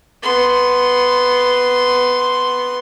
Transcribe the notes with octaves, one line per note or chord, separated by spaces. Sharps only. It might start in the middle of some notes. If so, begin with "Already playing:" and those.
B3 C6